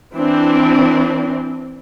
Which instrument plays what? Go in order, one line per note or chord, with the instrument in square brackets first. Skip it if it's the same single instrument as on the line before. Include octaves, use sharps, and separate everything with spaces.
[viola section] E3 C4 D4